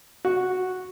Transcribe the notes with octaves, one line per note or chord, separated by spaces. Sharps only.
F#4